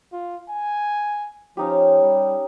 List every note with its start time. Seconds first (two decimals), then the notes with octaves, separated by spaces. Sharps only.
0.12 F4
0.49 G#5
1.57 F3 C#4 D#4 G4
2.01 G3